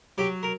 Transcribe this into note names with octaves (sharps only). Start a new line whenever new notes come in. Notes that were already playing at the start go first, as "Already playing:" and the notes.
F#3 G4
A#4